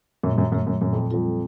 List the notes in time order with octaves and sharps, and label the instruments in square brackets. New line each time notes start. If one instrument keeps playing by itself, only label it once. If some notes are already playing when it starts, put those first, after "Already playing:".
[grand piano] F#2 [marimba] A#2
[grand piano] G2
F#2
[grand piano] F#2 [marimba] F#3 A3
[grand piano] F#2
[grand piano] F#2 [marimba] A#2
[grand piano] F2
[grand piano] F2 [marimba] G3 C4 F4 A4